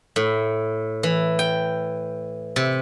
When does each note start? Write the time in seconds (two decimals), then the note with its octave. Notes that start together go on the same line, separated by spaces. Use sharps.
0.16 A2
1.03 E3
1.39 G5
2.56 C3